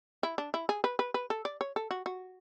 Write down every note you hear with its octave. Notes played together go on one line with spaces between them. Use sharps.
E4
D4
E4
G#4
B4
B4
B4
A4
D5
C#5
A4
F#4
F#4